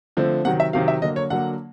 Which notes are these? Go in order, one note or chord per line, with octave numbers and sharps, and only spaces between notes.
D3 F3 A3 C4
C3 D#3 F#3 F#5
E5
C3 D#3 F#3 F5
E5
D3 F#3 A#3 D#5
C#5
D3 F#3 A#3 F#5